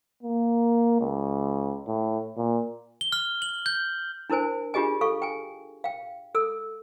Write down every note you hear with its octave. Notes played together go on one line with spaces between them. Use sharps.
A#3
C#2
A2
A#2
G7
F6
F#7
G6
D4 E4 A#4 C5 G#5
D4 F4 G4 G#4 D#5 G#5
A4 F5 C#6
G5 G#5
F5 G5
A4 E6